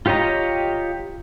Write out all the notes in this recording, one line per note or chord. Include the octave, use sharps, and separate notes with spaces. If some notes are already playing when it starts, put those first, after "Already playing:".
F4 G4 C#5 D#5 A#5